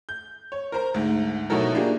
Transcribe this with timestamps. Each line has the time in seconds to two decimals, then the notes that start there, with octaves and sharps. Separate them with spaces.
0.09 G6
0.52 C#5
0.72 A#4 C5 A#5
0.94 D2 G#2
1.50 B2 F#3 D#4 E4 A4 A#4
1.75 A#3 D4 D#4 F4 G4 G#4